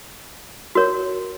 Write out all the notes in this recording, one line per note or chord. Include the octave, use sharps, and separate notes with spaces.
F#4 A#4 C#5